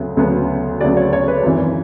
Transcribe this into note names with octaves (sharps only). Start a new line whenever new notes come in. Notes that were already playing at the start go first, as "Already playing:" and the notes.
Already playing: D2 C#3 F#3 B3
D2 C#3 F#3 B3
D2 C#3 F#3 B3 D5
C#5
C#5
B4
G#1 F#2 E3